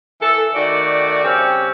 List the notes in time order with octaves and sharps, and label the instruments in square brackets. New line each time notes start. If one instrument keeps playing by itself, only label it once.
[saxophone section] E3 A4
D#3 A3 F#4 D5
C#3 G3 C4 C#4 G4